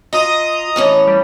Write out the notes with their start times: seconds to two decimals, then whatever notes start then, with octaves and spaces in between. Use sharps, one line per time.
0.13 F4 D#5 A#5 D#6
0.76 A2 E3 C#4
1.07 G3